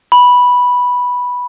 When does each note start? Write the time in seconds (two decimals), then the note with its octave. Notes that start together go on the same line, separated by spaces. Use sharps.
0.12 B5